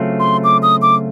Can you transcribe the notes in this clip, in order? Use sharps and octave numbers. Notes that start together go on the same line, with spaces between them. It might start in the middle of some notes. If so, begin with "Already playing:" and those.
Already playing: C#3 F#3 A3 C4 F4
C6
D6
D#6
D6